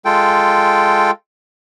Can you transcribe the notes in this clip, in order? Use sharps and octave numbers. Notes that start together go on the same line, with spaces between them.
G#3 F4 A4 G5